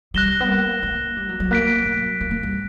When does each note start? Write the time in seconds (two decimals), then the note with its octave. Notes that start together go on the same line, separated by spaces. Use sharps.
0.14 G3 F#6 A#6 E7 G7
0.40 B3
0.49 A#3
0.83 A#3
1.16 G3
1.29 F#3
1.40 F#3
1.51 A#3 F#6 B6 D7
1.85 F#3
2.21 A#3
2.31 A#3
2.43 G3